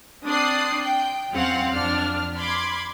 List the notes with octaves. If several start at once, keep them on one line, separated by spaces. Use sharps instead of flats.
C4 D4 D#6 F#6 C7
G5
E2 F#3 C4 C#4 F5 F#5
F2 D4 F6
B5 C6 D6 G#6